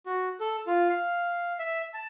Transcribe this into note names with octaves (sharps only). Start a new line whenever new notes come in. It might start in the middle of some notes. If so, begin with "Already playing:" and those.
F#4
A4
F4
F5
E5
A5